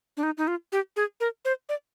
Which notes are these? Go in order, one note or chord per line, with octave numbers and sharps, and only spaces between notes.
D4
D#4
D#4
F4
G4
G#4
A#4
C5
D5